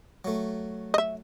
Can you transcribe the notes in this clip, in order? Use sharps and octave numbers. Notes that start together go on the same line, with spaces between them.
F#3 A3
D#5 E5